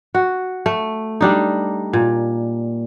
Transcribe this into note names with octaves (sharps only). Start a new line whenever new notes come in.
F#4
A3
G3 D4 D#4
A#2